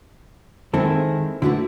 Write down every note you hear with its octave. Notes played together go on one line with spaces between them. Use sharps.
D#3 G#3 C4 E4 A4
D3 A3 E4 F#4 B4